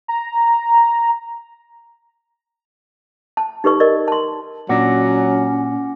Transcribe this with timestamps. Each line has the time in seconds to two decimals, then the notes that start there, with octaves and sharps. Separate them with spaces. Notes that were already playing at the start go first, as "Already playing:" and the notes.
0.08 A#5
3.37 A5
3.64 D#4 G4 A4 B4 D5 C#6
3.80 A#4 D5 D#5
4.08 A5 C6
4.69 A#2 F#3 C#4 D4 F#5 D6 A#6